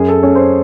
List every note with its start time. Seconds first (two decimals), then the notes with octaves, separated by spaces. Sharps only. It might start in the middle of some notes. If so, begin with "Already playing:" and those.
Already playing: F#2 G#4
0.08 A4
0.23 C#4 C#5
0.35 C5
0.39 C#5